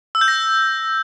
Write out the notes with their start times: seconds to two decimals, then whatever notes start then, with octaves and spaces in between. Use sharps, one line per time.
0.15 E6
0.21 G6
0.28 A#6